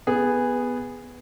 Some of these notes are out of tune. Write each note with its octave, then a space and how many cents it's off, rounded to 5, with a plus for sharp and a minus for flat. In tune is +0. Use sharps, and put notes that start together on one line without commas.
B3 +0 G#4 -15